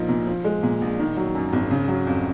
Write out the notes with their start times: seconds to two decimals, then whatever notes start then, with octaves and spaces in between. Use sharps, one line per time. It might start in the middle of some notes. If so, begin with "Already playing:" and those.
Already playing: A#1 F3 A#3 D#4
0.09 A#2
0.27 F3
0.44 G#3
0.63 A#2
0.82 A#1
0.99 D#3
1.17 F#3
1.35 F#2
1.53 G#1
1.71 C#3
1.88 F#3
2.07 F2